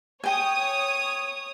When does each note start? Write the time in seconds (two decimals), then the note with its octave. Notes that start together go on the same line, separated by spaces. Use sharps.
0.24 C#5 G5 G#5 D#6